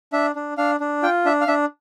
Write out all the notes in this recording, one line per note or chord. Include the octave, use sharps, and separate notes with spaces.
D4 E5
D4
D4 F5
D4
F4 G5
D4 E5
F5
D4 E5